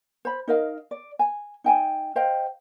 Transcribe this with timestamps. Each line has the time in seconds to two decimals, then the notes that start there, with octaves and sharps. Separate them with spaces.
0.25 C5 B5
0.48 D#4 A#4 D#5 F5
0.91 D5
1.19 G#5
1.64 D#4 G5 G#5
2.16 C5 D#5 F5 G5